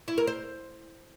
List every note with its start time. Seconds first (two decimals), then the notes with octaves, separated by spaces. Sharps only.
0.08 E4
0.18 A#4
0.27 C5